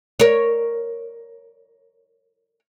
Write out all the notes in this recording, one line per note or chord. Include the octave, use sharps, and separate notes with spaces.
A#4 C#5